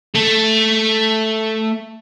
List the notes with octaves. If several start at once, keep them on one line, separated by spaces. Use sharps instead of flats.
A3 A4